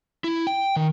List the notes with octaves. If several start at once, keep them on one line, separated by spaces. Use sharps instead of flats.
E4
G5
D#3